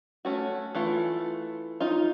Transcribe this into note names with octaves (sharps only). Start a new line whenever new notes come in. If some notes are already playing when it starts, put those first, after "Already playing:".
A3 C#4 F#4
E3 A3 F4
D#4 F4